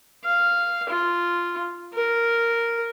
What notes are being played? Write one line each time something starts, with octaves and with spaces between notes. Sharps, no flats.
F5
F4
A#4